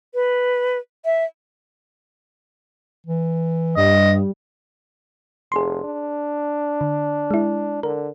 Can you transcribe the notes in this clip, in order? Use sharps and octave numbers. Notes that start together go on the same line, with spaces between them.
B4
E5
E3
G2 G3 D#5
F1 G#4 C6
D4
D3
G#3 E4
D3 A#4